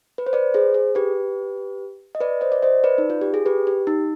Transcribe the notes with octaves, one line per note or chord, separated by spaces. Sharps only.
B4
C5
B4 D5
G#4 C5
G#4
G4 B4
D#5
B4 D5
C5 D#5
D5
C5 D#5
B4 D5
D#4
F4
G4
G#4
G4 B4
G4
D#4